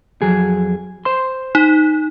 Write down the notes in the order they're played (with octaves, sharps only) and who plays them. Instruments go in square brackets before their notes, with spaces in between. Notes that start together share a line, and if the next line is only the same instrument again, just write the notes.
[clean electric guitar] F2 F#3 G#4
C5 C6
[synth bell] D#4